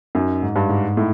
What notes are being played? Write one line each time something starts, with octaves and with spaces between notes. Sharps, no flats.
F#2 D#4
G#2
G2
G#2
A2 D#4